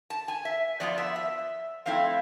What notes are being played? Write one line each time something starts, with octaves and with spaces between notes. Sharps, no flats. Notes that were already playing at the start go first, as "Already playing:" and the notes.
A5
G#5
E5
F3 B3 F4 D5
E5
E5
F3 A3 C4 E4 F5